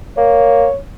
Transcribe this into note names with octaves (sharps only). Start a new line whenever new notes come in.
A#3 C#5